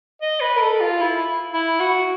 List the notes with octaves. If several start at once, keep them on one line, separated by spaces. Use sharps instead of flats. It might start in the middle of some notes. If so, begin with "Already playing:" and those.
D#5
B4
A#4
A4
F4
E4
E4
F#4